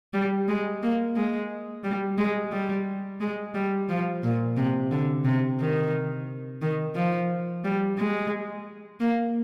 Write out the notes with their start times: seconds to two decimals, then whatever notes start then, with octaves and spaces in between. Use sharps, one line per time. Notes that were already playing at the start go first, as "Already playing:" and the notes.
0.14 G3
0.48 G#3
0.83 A#3
1.16 G#3
1.84 G3
2.18 G#3
2.52 G3
3.21 G#3
3.55 G3
3.89 F3
4.24 A#2
4.57 C3
4.91 D3
5.25 C3
5.60 D#3
6.62 D#3
6.96 F3
7.64 G3
7.98 G#3
9.01 A#3